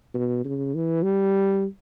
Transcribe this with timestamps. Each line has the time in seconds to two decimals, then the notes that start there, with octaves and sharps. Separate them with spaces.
0.14 B2
0.45 C#3
0.75 E3
1.03 G3